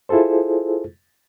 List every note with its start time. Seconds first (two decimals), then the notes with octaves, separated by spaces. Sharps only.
0.09 E4 F4 G#4 A4 C5